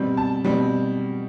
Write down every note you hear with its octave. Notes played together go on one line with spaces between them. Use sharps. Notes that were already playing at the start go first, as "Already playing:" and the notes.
Already playing: B2 G3 C4
A5
B2 G3 C4